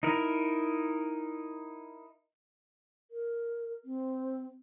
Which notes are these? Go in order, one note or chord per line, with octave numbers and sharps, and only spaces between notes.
D#4 E4 A#4
A#4
C4